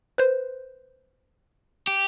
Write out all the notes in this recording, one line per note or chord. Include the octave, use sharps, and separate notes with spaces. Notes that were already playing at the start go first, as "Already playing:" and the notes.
B4 C5
G4